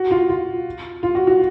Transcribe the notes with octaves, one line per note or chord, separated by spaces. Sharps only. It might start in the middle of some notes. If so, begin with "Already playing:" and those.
Already playing: F#4
F4
F4
F4
F#4
F#4